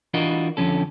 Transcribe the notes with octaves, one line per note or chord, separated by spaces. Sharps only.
E3 D4 F4 F#4 A#4 D#5
F2 D3 F3 C#4 A4